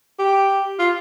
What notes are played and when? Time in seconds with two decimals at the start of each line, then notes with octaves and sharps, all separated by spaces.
0.19 G4
0.79 F4